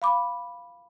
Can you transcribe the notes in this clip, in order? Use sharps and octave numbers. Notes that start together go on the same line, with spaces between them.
F5 B5 D6